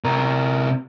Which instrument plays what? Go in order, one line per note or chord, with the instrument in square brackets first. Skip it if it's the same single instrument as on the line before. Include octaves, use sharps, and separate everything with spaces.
[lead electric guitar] C3 A#4